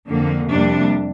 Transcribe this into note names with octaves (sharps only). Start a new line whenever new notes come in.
F2 D3 A#3
F2 C3 G3 A#3 D4